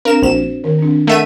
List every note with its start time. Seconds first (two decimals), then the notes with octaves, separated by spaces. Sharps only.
0.05 C4 D4 A#4 F5 E7
0.22 A#1 F#4 C5 E7
0.64 D#3 A#4
0.79 C4 D4
1.07 A3 A#4 D#5 E5 F#5 D#7